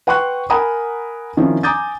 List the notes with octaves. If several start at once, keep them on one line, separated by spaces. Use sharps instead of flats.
B4 F#5 G5 C6 C#6 F#6
A#4 F#5 G#5 A#5 B5 D#6
D#3 F3 C4 C#4 E4
G#5 A#5 D6 D#6 G6 A6